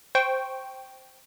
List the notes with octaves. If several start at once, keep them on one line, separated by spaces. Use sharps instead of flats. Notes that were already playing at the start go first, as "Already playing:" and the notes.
C5 G5 C#6